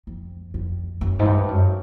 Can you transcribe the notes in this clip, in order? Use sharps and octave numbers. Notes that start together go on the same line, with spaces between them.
F2
F2
F#2
G#2
G2
F#2